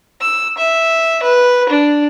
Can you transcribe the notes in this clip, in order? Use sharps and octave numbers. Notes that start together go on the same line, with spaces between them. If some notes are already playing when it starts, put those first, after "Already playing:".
E6
E5
B4
D4